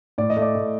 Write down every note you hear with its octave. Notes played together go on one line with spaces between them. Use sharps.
A2 D5
D#5
A3
D5
A2